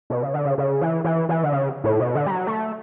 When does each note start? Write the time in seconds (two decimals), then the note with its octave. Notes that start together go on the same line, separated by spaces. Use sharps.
0.10 B2
0.22 C#3
0.34 D3
0.45 C#3
0.58 C#3
0.81 E3
1.04 E3
1.29 E3
1.43 D3
1.52 C#3
1.84 A2
2.00 B2
2.15 D3
2.26 G3
2.31 F#3
2.47 A3